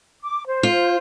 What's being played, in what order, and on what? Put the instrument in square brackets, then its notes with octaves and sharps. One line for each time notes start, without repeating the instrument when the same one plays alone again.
[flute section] D6
C5
[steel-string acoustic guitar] F4